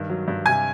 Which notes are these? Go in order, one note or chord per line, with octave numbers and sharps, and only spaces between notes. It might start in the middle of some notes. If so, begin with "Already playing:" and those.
Already playing: G2 D#3
F#3
G2
C3 G#5 G#6